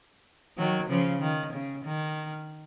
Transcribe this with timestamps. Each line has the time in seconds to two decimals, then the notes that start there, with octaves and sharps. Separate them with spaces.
0.58 D#3 F#3
0.89 C#3 F3
1.21 D#3
1.53 C#3
1.85 D#3